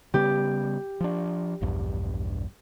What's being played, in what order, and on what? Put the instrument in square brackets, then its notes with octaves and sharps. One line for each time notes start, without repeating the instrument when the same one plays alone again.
[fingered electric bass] C#3 G3 B3 [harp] G4
[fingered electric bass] F3 D4
A#1 E2 G2